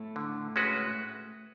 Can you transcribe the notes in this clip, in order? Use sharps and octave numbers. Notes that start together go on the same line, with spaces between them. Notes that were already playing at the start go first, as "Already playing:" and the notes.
Already playing: A2 A3
D3
G#3 C#4 F#4 B4